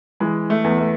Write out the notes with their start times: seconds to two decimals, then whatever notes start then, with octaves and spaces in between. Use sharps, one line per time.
0.20 E3 G#3
0.50 A3
0.64 E2
0.79 A3